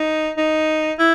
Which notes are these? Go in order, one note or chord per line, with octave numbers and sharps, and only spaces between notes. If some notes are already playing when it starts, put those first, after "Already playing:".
Already playing: D#4
D#4
E4